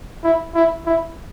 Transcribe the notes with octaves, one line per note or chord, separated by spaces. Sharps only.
E4
E4
E4